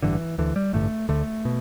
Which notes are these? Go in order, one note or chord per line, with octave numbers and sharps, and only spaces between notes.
A1 G2 D3 E3
D2 D3 E3
G3
A1 G2 D3 A3
D2 D3 A3
B2